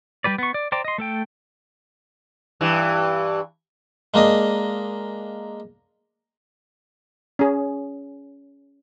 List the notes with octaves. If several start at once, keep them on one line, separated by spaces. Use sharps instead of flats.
G3 G4 B4 D5
B3 C#6
D5
C5 D5 G5 A#5 D6
D#5 C6
A3 A4 G5
G2 E3
G#3 A#3 D4 D#5
C#4 G#4